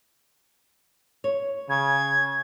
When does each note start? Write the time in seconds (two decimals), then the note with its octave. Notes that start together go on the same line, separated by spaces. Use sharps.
1.24 C#5
1.70 C#3 G#6